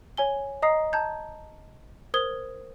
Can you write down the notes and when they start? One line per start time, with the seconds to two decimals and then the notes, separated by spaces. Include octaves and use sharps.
0.17 C#5 G#5 G7
0.62 D#5 A#5 D#6 C7
0.93 A5 A#5 G6 G#6
2.14 A#4 C5 D#6 G#6 G7